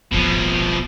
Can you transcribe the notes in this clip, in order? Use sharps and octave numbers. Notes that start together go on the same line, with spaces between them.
D1 G#1 B2 F3